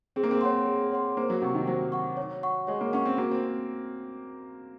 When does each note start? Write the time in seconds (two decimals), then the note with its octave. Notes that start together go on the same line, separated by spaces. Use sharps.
0.16 C4 G#4
0.23 A#3
0.31 C4
0.41 C#5 F#5 C6
0.66 G#4
0.92 C#5 F#5 C6
1.17 A#3 C5
1.30 F#3
1.42 C3 F#5 C#6
1.55 D#3
1.67 F#3 C5
1.92 F#5 C#6
2.17 C#5
2.43 F#5 C#6
2.67 G#3 C#5
2.81 A#3
2.93 C#4 F#5 C#6
3.05 C4
3.18 A#3 F#4
3.31 C4